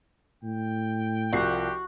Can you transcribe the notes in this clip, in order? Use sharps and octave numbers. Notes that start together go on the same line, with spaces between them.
A2 G5
C2 F3 F#4 G4 C7